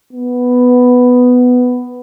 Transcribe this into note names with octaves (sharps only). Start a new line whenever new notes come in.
B3